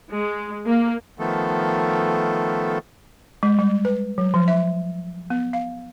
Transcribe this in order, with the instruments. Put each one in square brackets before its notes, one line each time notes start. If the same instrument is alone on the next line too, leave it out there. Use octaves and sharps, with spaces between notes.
[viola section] G#3
A#3
[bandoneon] D#3 F3 A3 B3 A4
[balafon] G#3
G3
B4
F#3
F3
E5
B3
F5